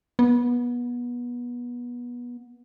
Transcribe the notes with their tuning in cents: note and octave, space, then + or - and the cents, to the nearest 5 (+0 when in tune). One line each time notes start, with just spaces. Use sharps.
B3 -25